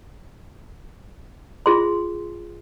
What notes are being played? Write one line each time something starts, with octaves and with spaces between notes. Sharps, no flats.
F4 G#4 C6